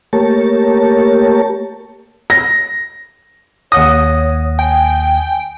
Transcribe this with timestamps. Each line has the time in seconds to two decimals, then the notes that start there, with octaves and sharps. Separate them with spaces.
0.13 A3 A#3 G4 A#4 C#5 A5
2.30 A#6
3.72 D#2 C#5 F#5 D#6 A#6
4.59 G5 G#5